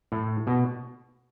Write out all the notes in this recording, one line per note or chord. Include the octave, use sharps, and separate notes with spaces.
A2
B2